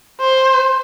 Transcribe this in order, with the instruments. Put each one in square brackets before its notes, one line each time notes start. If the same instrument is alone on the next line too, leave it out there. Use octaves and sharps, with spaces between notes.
[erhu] C5